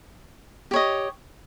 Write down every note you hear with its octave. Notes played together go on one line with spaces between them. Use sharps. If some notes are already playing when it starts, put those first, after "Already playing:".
G4 C#5 D#5